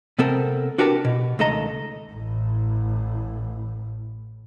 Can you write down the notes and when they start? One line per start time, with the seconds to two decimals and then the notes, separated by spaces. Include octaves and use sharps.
0.19 C3 B3 C4 A4 A#4
0.78 D4 F#4 G4 A#4 B4 A5
1.05 B2
1.39 C#2 D#3 A3 A4 D#5 A#5
2.12 A1 A2